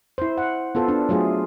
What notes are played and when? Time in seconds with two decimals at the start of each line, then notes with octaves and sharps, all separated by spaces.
0.18 E4 C5
0.38 F#5
0.75 B3 F4 A4 C5
0.88 D4
1.09 F#3 A3 F4 G#4